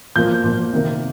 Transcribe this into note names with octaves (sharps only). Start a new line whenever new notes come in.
A#2 F3 A#3 G6
A#2 F3 A#3
C3 D#3 A#3